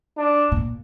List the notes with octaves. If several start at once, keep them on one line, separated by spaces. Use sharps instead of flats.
D4
A#2